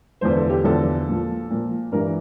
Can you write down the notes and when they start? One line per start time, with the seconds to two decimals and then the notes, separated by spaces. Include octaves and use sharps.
0.21 E2 D3 F3 C5
0.36 A4
0.50 G4
0.64 E2 D3 F3 A4
1.08 A#2 F3
1.50 A#2 F3
1.92 G2 E3 G3 A#4